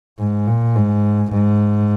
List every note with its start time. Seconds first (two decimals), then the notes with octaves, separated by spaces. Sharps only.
0.19 G#2
0.47 A#2
0.75 G#2
1.32 G#2